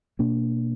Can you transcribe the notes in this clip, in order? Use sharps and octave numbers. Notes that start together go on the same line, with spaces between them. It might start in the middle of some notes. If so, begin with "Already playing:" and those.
B2 A#3 D4